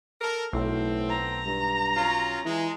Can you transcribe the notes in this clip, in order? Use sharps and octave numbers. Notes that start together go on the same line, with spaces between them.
A4 A#4
B1 A2 A3 B3 C4
A#5
G2
F#3 C#4 F4
E3 G#3